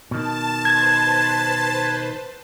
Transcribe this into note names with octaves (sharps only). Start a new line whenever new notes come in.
B2 D#3 A5
B4 C5 G#6